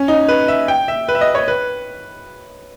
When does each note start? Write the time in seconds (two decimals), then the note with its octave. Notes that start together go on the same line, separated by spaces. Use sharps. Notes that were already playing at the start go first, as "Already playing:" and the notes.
Already playing: C#4
0.08 D#4
0.28 B4
0.48 E5
0.68 G5
0.88 E5
1.09 B4
1.15 E5
1.21 D#5
1.35 C#5
1.48 B4